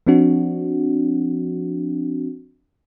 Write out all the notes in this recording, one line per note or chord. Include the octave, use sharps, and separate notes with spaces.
F3 C4 D4 F#4